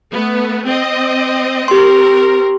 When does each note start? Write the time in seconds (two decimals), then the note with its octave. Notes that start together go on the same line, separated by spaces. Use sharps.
0.12 A3 B3
0.67 C4 D#5
1.68 C4 G4 A#4 C6